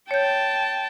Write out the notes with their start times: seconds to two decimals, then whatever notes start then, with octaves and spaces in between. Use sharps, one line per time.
0.11 C#5 G5 A5 G6